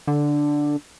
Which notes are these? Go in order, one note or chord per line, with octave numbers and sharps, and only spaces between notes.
D3